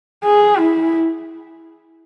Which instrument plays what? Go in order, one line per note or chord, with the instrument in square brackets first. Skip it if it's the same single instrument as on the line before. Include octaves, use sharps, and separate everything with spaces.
[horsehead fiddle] G#4
E4